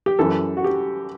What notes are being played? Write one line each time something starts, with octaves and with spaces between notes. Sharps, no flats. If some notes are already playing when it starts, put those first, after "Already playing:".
G4
F#2 E3 A4
F#4
G4